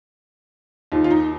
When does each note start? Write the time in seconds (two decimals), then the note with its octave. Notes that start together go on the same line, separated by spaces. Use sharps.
0.92 D#2 F4
0.95 D#3
1.04 F4
1.11 D#4